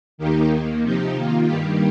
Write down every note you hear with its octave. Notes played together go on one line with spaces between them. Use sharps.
D#2 D#3 A#3 D#4 G4
D#2 D#3 A#3
C3 F3 D#4 G4
D#3 A#3 F4
G2 D#3 G3 A#3 G4